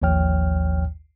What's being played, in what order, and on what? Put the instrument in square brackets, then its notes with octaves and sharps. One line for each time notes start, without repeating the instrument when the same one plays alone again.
[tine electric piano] A1 D#2 F3 C#5 G5 F6